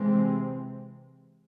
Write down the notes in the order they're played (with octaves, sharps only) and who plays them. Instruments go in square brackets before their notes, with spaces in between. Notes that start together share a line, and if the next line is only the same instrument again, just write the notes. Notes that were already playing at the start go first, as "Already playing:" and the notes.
Already playing: [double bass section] C3 E3 G#3 C4